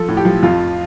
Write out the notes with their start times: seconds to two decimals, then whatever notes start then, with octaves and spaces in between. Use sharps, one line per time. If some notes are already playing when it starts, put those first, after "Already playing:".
Already playing: F3 A4
0.08 A2
0.17 G4
0.25 F3
0.43 F2 F4